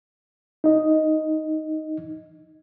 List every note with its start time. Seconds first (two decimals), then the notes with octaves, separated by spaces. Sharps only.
0.64 D#4 D#5